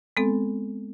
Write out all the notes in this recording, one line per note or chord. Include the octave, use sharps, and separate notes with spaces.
G#3 B3 C4 A4